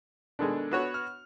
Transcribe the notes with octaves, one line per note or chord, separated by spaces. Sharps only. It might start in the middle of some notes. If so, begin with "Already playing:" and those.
B2 D#3 G#3 D4 A4
B3 F#4 C#5
F6